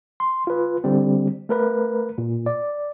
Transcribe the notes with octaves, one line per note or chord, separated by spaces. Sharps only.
C6
F4 B4
D3 G3 C4
A3 A#4 B4
A#2
D5